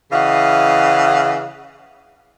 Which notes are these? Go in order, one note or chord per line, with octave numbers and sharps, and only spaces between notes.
C#3 E3 D#5 F5 F#5